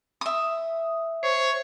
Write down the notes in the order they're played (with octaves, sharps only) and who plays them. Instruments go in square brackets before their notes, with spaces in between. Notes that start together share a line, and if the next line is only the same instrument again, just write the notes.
[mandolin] E5 D#6
[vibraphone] C5 [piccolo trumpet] C#5